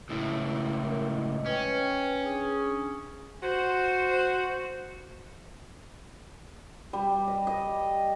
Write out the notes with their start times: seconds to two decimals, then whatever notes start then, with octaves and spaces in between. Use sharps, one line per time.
0.09 C#2 A2 E4
0.79 E4 A#4
1.10 D#5
1.46 C#4 B4 G5
2.23 D4 G#4 D#6
3.43 F#4 C5
6.93 G3
7.27 D#5
7.47 D#5